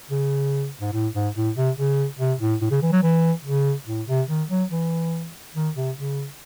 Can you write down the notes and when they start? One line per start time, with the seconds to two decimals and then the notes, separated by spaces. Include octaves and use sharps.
0.10 C#3
0.81 G#2
0.93 A2
1.14 G#2
1.36 A2
1.56 C3
1.77 C#3
2.19 C3
2.41 A2
2.61 A2
2.71 C#3
2.82 E3
2.92 F#3
3.03 E3
3.45 C#3
3.87 A2
4.08 C3
4.29 D#3
4.49 F#3
4.71 E3
5.55 D#3
5.76 C3
5.96 C#3